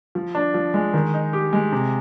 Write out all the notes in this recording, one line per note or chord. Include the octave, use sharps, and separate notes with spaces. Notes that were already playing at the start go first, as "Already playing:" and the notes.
F3
D4
F3
G#3
D#3
D#4
G4
G#3
C3